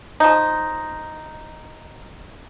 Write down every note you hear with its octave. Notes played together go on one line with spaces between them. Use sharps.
F3 D#4